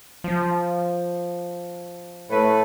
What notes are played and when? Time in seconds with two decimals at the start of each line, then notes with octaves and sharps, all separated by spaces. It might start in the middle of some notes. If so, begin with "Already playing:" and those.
0.24 F3
2.30 A2 A3 B4